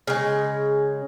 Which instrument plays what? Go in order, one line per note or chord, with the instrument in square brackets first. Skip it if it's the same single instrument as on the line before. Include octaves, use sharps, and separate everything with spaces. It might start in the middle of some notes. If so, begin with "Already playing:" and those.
[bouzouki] C#3 G#3